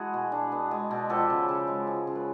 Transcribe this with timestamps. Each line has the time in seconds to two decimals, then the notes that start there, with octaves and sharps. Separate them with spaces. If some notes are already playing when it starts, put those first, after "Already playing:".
Already playing: E3 G#3 A3 E4 F#4 G#4
0.14 B2
0.32 D4
0.52 B3
0.71 G#3
0.91 B2
1.10 F3 G4 A4
1.30 C#3
1.49 C#3
1.67 G#3
1.87 F3
2.07 C#3
2.15 B4